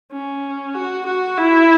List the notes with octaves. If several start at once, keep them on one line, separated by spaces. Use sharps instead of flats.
C#4
F#4
F#4
E4